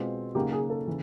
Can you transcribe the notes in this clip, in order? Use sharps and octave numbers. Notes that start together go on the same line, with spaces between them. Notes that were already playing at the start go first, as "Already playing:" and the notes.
Already playing: B2 G#3 C4 F4
C#3 F#3 A#3 D#4 F#4 G4
G#4
A4
C#3 E3